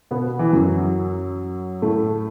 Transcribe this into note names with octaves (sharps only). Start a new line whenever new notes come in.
B2 B3
E3
F#2 F#3
A2 A3